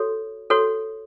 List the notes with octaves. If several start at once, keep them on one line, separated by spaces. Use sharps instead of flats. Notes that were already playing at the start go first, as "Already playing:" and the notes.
Already playing: F#4 A4 C#5
F#4 A4 C#5